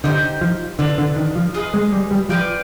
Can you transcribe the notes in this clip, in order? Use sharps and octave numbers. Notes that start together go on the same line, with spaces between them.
D3 D#4 G4 C5
F3
D3 D4 F4 B4
D3
D#3
F3
F4 G#4 B4 D#5
G#3
G3
G3
F3 F4 B4 D5 G5